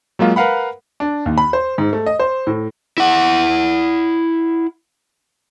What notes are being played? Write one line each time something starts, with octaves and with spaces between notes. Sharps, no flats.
F#3 G#3 A#3 F4
A#4 B4 F5 F#5 B5
D4
D#2
B5
C5
G#2
A3
D#5
C5
A2
E4 F#5